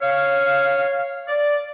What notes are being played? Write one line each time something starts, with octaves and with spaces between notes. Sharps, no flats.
C#5 F5
D5